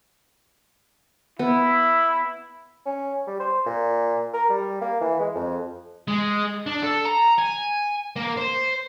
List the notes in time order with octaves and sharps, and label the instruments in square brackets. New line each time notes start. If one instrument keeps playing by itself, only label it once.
[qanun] B3 [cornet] E4
[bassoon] C#4
G3
C5
A#2
A#4
G3
A#3
E3
G#3
F2
[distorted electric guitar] G#3
D4
A4
A#5
G#5
A#3
C5